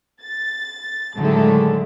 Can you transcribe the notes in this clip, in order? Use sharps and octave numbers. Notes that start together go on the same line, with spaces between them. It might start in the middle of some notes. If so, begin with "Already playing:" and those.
A6
A2 D3 D#3 F#3 G#3 A3